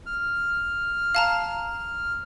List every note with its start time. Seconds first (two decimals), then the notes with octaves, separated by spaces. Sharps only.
0.06 F6
1.15 F5 A5 A#5